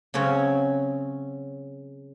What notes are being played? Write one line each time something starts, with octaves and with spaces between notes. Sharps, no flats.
C#3 F#3 C4 C#4